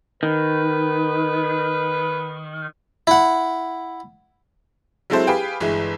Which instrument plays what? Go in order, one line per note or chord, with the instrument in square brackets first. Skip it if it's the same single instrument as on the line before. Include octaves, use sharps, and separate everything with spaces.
[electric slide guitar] D#3 [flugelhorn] B4
[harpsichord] E4 F#5
[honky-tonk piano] F#3 G#3 C4 E4 A4 C5
G4 G#4 B4 F5 G5
G1 E3 G#3